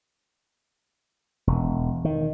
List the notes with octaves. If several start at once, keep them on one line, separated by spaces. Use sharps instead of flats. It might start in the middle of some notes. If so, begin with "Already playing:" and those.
E1
D#3